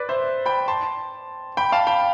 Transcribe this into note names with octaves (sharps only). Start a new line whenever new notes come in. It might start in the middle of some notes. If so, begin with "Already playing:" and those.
Already playing: B4 D5
C5 E5
G5 B5
A5 C6
G5 B5
F5 A5
G5 B5